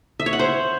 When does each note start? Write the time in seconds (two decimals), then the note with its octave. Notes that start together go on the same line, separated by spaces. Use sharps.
0.20 E5
0.26 C#5
0.33 F#5
0.39 C5